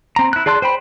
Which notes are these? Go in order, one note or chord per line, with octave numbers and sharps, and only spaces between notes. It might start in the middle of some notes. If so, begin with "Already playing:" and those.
C4 A#5
E4 F#6
G#4 D5 A5 C6 F#6
C5 G5 B5